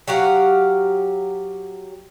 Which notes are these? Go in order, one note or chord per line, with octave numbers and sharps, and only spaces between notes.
F#3 G4 F5 F#5